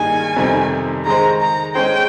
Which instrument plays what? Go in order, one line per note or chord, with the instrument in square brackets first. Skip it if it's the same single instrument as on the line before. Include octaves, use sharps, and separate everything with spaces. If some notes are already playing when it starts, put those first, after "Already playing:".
Already playing: [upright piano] G2 D#3 A#3 D#4 G#4 [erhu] G#5
[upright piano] F2 C3 D#3 G3 C4
[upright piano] D#3 G#3 D#4 G#4 C5 [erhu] A#5
[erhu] A#5
[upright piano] G#3 C#4 G#4 C5 [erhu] G5